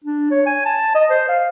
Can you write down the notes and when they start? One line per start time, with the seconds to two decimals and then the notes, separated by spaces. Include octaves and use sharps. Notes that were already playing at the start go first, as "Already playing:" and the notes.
0.04 D4
0.31 C#5
0.46 G#5
0.65 A5
0.95 D#5
1.10 C5
1.29 F5